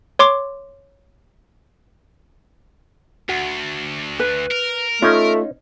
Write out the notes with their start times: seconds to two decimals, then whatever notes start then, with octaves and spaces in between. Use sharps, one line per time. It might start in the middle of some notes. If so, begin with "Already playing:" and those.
0.19 C#5 C6 D6
3.29 D2 F#4
4.20 B4
4.51 A#4
5.02 A3 C#4 D#4 F4